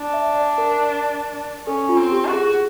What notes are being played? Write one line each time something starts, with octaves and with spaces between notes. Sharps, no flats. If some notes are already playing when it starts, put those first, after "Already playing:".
Already playing: D4
E5
D5
A#4
C#4 A4
F4
C4
G4
F#4
G#4
G#4